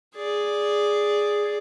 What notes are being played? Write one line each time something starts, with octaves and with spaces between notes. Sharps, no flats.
G#4 D5